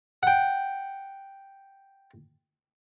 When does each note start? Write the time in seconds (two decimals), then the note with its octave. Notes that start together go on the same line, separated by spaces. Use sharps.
0.23 F#5 G5